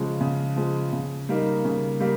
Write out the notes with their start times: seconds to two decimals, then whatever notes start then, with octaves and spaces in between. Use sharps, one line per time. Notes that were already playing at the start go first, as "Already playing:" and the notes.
Already playing: C#3 F3 G#3
0.21 C#3
0.56 F3 G#3
0.93 C#3
1.29 G3 A#3 D#4
1.65 C#3
2.00 G3 A#3